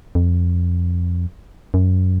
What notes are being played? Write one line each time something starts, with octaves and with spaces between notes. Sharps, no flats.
F2
F#2